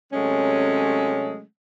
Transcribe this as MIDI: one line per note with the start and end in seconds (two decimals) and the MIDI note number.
0.13 1.41 48
0.13 1.41 54
0.13 1.41 56
0.13 1.41 57
0.13 1.41 61